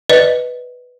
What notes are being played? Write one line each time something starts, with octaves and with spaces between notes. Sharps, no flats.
B4 D5 D#5